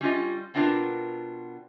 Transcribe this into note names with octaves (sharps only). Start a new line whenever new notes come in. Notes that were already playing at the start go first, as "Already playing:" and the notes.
G3 C#4 F4 D#5
B2 B3 C4 D4 F4 A#4